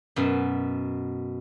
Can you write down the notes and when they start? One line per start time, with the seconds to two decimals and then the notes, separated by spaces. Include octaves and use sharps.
0.16 F#2 B2